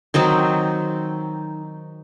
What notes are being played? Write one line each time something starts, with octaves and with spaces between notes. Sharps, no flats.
D#3 F#3 C4 D#4